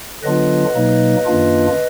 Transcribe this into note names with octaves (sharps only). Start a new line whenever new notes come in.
D3 F#3 B3 D4 F4 B4 D#5
B2 F#3 A#3 D#4
F#2 D#3 A#3 D4 F4